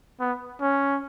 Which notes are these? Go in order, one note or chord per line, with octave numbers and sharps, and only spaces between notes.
B3
C#4